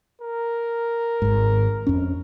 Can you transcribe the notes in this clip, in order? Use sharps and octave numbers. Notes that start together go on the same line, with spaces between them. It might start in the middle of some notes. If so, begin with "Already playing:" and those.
A#4
G#1 G#2
F2 C#4